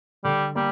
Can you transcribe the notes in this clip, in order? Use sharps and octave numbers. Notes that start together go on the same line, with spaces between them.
D3 G3
G3 A#3